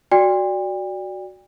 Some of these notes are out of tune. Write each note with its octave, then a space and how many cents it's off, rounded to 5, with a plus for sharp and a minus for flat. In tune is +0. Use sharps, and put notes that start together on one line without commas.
F#4 +0 D5 +0 G5 +35